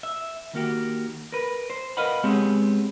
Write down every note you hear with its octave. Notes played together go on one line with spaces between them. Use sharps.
E5
D#3 A#3 F#4 G4
A#4 B4
C5
A#4 B4 D#5 F5 F#5 B5
G#3 B3 C4 G4 G#4 C#5